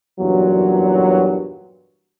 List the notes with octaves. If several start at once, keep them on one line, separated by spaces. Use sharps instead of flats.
F#1 E2 G2 A#2 F#3